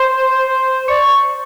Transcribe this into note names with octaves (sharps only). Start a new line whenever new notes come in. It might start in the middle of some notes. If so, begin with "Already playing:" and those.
Already playing: C5 C6
D5 C#6